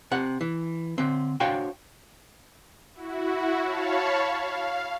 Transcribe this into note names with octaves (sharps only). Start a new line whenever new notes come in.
C3 F#5
E3
D3 C4
D4 F#4 C5 C#5 F5 G5
E4 F#4
C#5 F5 A5 B5 C#6
F5